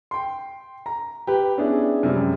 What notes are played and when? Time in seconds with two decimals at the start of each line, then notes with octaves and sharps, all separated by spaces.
0.11 G5 C6
0.86 A#5
1.27 G4 B4
1.58 B3 C#4 D4 E4 G#4
2.03 F#2 C3 G3 G#3